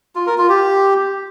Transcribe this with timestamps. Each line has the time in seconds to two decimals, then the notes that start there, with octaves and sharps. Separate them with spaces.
0.15 F4
0.27 A#4
0.38 F4
0.49 G4